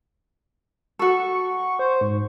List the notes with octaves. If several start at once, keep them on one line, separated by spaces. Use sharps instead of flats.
F#4 A4 C#6
C5
G#2